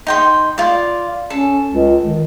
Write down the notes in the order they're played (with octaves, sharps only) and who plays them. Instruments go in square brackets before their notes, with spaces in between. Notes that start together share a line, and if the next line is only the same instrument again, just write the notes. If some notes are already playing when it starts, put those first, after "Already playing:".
[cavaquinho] D#4 G5 C6
F4 D5
[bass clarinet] C#4 [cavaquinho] A4
[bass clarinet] C#2
D#3